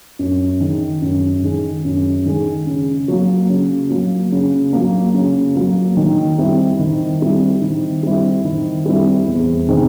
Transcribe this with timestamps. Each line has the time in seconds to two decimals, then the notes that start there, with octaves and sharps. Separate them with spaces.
0.19 F#2
0.61 D#3 G#3
1.02 F#2
1.43 D#3 G#3
1.85 F#2
2.26 D#3 G#3
2.67 C#3
3.08 F#3 A#3
3.49 C#3
3.91 F#3 A#3
4.32 C#3
4.73 F#3 A#3
5.14 C#3
5.56 F#3 A#3
5.97 D#3
6.38 G3 C4 E4
6.79 D#3
7.21 G3 C4 E4
7.62 D#3
8.03 G3 C4 E4
8.45 D#3
8.86 G3 C4 E4
9.27 E2
9.68 C3 D#3 G#3 C4